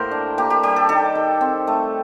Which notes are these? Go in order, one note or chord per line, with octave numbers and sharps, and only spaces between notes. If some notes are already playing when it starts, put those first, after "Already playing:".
Already playing: A2 F#3 A#3 G4 A#4 C5
D4
A#3 G4
G4
G3 G4
A4
D#3 A4
D#3
C4
A3